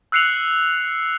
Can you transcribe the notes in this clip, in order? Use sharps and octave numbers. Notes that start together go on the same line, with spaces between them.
E6 F#6 C7 C#7 F7 F#7